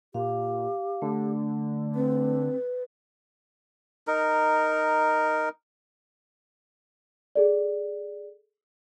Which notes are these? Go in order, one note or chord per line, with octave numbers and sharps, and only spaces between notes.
A#2 G4 F5
D3 A3
C4 B4
D#4 A#4
G#4 A4 D5